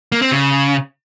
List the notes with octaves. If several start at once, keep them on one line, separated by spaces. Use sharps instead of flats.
A#3
C4
C#3